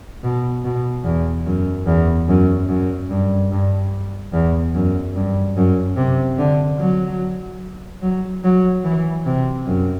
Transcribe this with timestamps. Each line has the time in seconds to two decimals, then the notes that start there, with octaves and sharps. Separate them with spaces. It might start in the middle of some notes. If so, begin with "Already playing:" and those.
0.24 B2
0.65 B2
1.04 E2
1.46 F#2
1.87 E2
2.29 F#2
2.69 F#2
3.10 G2
3.51 G2
4.33 E2
4.75 F#2
5.15 G2
5.57 F#2
5.97 C3
6.38 D3
6.79 F#3
8.02 F#3
8.44 F#3
8.84 E3
9.26 C3
9.67 F#2